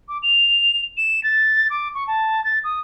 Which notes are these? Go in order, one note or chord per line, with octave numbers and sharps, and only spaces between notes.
D6
F7
E7
A6
D6
C#6
A5
A6
D#6